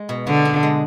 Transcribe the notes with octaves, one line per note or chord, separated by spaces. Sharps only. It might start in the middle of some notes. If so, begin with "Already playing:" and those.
Already playing: G#3
B2
B2 D3
D4
G#3